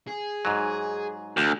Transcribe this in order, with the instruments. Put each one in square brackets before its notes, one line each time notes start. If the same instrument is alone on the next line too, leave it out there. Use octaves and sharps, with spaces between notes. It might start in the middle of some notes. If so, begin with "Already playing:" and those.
[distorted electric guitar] G#4
[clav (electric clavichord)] G#2 F#3
[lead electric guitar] D2